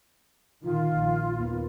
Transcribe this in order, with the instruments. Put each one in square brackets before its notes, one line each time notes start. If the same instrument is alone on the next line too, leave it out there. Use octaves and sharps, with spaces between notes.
[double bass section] A#2 D#3 [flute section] F4
[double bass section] A#1
D#2 A#3 B3